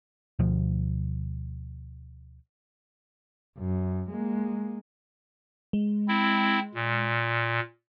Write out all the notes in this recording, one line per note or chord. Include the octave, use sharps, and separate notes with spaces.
D2 B2 F3
F#2
G#3 A#3
G#3
C4 E4
A#2